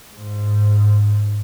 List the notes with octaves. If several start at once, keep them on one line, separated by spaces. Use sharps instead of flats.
G#2